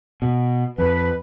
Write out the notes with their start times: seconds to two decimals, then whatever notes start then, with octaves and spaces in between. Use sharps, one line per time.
0.22 B2
0.78 F2 B4